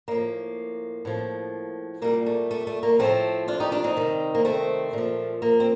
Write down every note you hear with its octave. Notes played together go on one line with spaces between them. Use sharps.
A2 F3 A#3
A2 F3
A#2 G3 A#3
A3
A3
A3
A#3
A2 F3 A3 C4
D4 F4
D#4 G4
D4 F4
C4 D#4
C3 D#3 G3
A#3
A3 C4
A#2 F3
A#3
C4